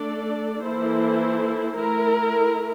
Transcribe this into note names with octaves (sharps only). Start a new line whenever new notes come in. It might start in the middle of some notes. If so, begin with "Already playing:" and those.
Already playing: A3 D4 A4 D5
E3 A#3 E4 A4 C5
A3 E4 A#4